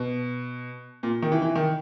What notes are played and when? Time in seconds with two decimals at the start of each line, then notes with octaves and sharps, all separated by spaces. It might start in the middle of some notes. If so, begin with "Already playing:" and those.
Already playing: B2
1.03 A#2
1.22 D#3
1.32 E3
1.42 E3
1.56 D#3